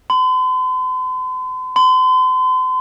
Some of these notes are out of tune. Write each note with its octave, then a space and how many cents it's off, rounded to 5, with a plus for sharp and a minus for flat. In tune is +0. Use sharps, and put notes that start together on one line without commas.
C6 -45
C6 -40